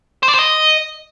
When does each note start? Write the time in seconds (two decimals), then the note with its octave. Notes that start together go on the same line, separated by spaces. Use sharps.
0.23 C5
0.28 D5
0.33 C5
0.39 D#5